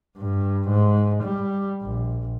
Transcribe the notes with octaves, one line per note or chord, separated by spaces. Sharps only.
G2
G#2
G3
A#1